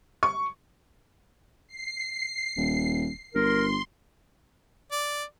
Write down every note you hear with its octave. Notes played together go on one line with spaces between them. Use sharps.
C#6
C7
D#1
G1 A#4 C6
D5